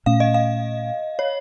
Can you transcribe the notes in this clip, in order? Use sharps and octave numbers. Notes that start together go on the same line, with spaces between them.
A#2 A3 C#4 F5
D#5
F5
C#5